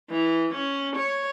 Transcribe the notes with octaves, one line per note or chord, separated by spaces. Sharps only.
E3
C#4
C#5